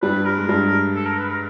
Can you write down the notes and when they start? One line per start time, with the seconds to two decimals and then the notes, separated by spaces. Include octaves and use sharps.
0.02 G2 G3 B4
0.25 A#4
0.38 G#3
0.49 G2 G3
0.95 A4
1.06 A#4
1.18 B4
1.30 A#4